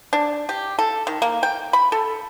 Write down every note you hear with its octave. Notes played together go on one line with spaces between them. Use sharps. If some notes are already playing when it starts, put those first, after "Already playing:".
D4
G4
A4
D#3
A#3
G5
B5
A4